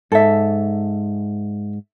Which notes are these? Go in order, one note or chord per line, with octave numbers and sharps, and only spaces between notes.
G#2 A4 E5